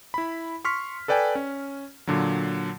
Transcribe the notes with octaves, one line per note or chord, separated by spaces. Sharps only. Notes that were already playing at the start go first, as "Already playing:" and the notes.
E4 B5
C6 C#6 F6 B6
A4 B4 D5 G5 G#5
C#4
A#2 D3 F#3